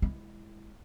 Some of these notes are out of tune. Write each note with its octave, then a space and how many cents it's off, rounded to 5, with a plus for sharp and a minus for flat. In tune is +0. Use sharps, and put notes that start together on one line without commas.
G#3 +0 E4 +0